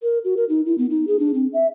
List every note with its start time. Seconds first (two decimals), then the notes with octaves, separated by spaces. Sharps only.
0.03 A#4
0.24 F#4
0.37 A#4
0.49 D#4
0.66 E4
0.78 B3
0.90 D#4
1.07 G#4
1.19 D4
1.34 C4
1.53 E5